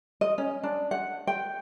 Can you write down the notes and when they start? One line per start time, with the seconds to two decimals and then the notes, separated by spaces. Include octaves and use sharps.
0.21 D#5
0.38 C#4
0.63 D4
0.91 F#5
1.27 G5